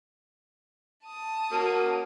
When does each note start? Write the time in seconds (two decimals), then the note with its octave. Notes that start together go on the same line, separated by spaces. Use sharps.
1.03 A5 D#6
1.52 A#3 C#4 F#4